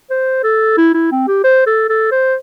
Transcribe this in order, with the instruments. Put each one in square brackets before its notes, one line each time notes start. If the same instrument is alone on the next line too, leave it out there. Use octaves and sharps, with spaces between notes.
[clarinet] C5
A4
E4
E4
C4
G4
C5
A4
A4
C5